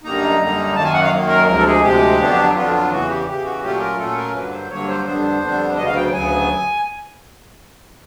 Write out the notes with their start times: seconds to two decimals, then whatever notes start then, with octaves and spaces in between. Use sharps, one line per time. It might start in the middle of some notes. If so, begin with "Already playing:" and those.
0.04 F#2 D3 G3 A#3 D#4 A#5
0.40 F#2 D3 G3 A#3 D#4
0.76 F#2 D#3 F#3 A#3 A5
0.85 G#5
0.93 F#5
1.03 F5
1.12 F#2 D#3 F#3 A#3
1.29 A#4
1.47 D2 C3 F3 G#3 A#4
1.59 A4
1.66 G#4
1.83 D2 C3 F3 G#3 G4
2.20 F2 D3 F#3 B3 D4
2.55 F2 D3 F#3 B3 D4 F4
2.74 F4
2.91 E2 C#3 E3 F#4
3.08 G4
3.27 E2 C#3 E3 G4
3.45 F#4
3.63 A#2 F#3 A3 C#4 F4 G4
3.80 A#4
3.98 A#2 F#3 A3 C#4 F4 A4
4.17 A#4
4.34 G2 D3 F#3 A#3 B4
4.52 C5
4.70 G2 D3 F#3 A#3 C#5
4.89 C5
5.06 F2 D3 G3 B3 D4 C5
5.42 F2 D3 G3 B3 D4
5.77 D2 C#3 F#3 B3 D#5
5.86 F5
5.96 G5
6.13 D2 C#3 F#3 B3 G#5